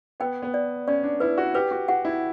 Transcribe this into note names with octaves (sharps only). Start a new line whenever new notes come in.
B3 G5
B3
D5
C#4 D5
D4
E4 B4
F#4
G4 B4
F#4
F#4 F#5
E4